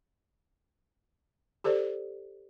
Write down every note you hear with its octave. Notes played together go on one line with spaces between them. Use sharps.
G4 A4 C5 D5